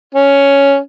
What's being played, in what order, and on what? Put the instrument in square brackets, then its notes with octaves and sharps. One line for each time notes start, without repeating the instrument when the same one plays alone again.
[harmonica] C#4